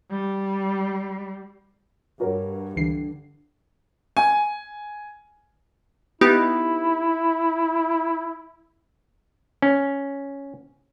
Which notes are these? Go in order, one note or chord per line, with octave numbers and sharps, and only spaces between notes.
G3
G2 F#4 A#4 C#5
C#2 D3 E3 C7
G#5
B3 D#4 E4 G4
C#4